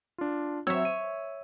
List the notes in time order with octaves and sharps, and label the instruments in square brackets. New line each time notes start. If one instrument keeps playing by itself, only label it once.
[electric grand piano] D4 F4
[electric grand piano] F#3 C4 E6 [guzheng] C#5 E5
[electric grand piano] D#7